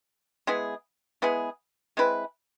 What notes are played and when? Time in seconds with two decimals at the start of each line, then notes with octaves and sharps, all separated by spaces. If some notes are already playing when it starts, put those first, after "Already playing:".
0.47 G#3 B3 E4 G#4
1.22 G#3 B3 E4 G#4
1.97 G#3 C4 E4 B4